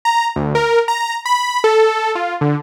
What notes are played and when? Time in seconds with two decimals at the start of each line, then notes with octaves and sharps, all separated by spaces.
0.05 A#5
0.36 D2
0.55 A#4
0.88 A#5
1.25 B5
1.64 A4
2.15 F4
2.41 D3